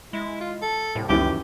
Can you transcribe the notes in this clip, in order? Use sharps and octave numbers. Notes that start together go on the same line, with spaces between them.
G#3 E4
F4
A4
C2 A2
C#2 F#2 D#3 E3 G4